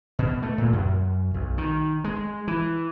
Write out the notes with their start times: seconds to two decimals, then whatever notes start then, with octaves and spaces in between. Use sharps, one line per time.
0.19 B2
0.43 A3
0.58 A#2
0.73 F#2
1.34 B1
1.58 D#3
2.04 G#3
2.48 E3